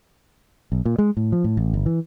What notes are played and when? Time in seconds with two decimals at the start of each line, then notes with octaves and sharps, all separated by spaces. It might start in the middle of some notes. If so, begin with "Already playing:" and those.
0.72 B1
0.85 A#2
0.98 G#3
1.17 A2
1.32 F3
1.44 A2
1.57 A1
1.74 G1
1.86 E3